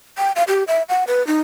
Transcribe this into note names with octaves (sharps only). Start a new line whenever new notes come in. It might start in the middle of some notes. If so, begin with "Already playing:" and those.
G5
F5
G4
E5
F#5
B4
D#4